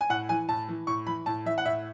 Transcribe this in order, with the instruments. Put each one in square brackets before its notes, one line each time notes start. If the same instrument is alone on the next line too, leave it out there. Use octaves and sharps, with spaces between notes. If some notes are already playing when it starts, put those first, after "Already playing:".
[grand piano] G#5
A2 F#5
E3 G#5
A2 A5
E3
A2 C#6
E3 B5
A2 A5
E3 E5
F#5
A2 E5